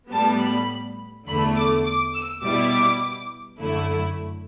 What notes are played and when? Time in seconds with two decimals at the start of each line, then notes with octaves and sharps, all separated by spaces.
0.12 A2 G3 B3 A5
0.41 B5
1.27 E2 D3 A3 B5
1.56 D6
1.85 D6
2.15 E6
2.43 B2 G3 B3 E4 D6
3.59 F#2 D3 A3 E4